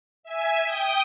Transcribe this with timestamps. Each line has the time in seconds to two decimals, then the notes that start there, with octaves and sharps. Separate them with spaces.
0.23 E5 G#5
0.64 G5 D#6 G6